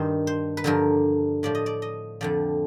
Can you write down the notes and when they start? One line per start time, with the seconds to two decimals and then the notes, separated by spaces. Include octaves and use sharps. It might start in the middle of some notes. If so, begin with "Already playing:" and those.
Already playing: G2 D#3 C5
0.27 C5
0.57 B4
0.64 G2 D3 F3 A#4
1.43 A2 F3 D5
1.55 D#5
1.66 D5
1.82 D#5
2.21 F2 D3 F3 D5